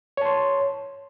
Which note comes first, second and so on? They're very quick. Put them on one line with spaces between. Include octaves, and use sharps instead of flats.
C#5 A5 C6